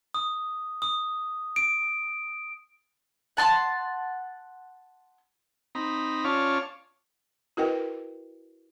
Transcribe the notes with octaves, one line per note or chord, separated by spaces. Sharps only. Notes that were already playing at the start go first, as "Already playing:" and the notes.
D#6
D#6
D7
F#5 A5 C6
C4 D#4 A#5 B5
C#4 F4 C#5 D5 F5 A5
E4 F#4 A#4 B4 D#5 G5